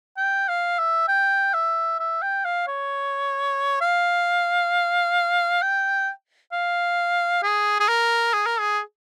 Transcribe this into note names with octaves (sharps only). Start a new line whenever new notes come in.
G5
F5
E5
G5
E5
E5
G5
F5
C#5
F5
G5
F5
G#4
G#4
A#4
G#4
A#4
G#4